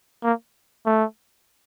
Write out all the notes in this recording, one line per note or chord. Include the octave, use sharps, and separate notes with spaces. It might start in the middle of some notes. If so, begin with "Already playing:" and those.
A#3
A3